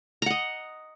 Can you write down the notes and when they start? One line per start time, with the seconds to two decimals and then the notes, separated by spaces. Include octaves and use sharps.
0.22 A#5
0.26 F#5
0.30 D#5